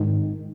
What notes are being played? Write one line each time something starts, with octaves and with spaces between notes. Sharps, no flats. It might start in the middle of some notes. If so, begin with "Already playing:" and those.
Already playing: G#1 G#2 D#3